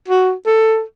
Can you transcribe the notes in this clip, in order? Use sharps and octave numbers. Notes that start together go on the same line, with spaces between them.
F#4
A4